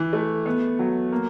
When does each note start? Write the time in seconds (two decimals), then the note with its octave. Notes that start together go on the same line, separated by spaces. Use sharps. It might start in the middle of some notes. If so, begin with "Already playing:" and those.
Already playing: E3
0.13 A3
0.46 B3
0.79 F#3
1.12 A#3